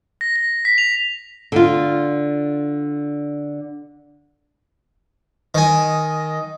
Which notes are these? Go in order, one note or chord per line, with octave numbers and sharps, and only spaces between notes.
A#6
A#6
B6
F7
D3 F4
D#3 D#5 G#5